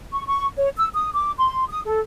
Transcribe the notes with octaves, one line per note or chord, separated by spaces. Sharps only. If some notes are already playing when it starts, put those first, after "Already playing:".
C#6
C#6
C#5
E6
D#6
D6
C6
D#6
A4